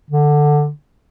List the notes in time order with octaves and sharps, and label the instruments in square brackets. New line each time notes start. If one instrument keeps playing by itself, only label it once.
[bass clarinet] D3